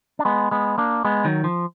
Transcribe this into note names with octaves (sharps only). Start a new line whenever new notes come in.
D4
G#3 B3
G#3 B3
A#3 D4
G#3 B3
D#3 F#3
F3